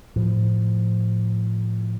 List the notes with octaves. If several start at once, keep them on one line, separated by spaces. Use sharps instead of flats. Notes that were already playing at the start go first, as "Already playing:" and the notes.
A2 F3